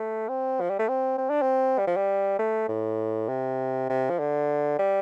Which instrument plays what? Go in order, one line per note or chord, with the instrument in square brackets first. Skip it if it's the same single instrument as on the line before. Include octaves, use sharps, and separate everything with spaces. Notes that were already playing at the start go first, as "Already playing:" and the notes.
Already playing: [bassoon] A3
C4
F3
G3
A3
C4
C4
D4
C4
G3
F3
G3
A3
A2
C3
C3
F3
D3
G3